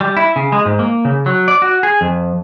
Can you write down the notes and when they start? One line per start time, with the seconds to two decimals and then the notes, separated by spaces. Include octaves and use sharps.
0.01 G3
0.17 E4
0.36 C#3
0.52 G#3
0.66 G#2
0.79 A#3
1.05 C#3
1.26 F#3
1.48 D5
1.62 F#4
1.83 G#4
2.01 F2